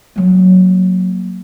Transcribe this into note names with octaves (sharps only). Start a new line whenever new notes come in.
F#3 A#3